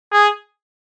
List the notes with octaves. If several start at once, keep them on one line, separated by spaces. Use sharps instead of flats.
G#4